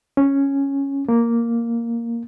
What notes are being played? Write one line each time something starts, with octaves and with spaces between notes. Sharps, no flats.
C#4
A#3